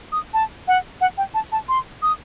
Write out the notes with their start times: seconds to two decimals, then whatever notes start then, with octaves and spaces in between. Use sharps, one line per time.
0.12 D#6
0.34 A5
0.68 F#5
1.01 F#5
1.18 G5
1.34 A5
1.52 A5
1.68 C6
2.02 D#6